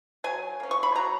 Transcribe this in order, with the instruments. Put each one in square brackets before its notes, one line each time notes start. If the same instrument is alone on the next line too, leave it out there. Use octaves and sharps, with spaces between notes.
[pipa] F#3 G#5
A#3 C#4
C#6
B5
F#3 A#5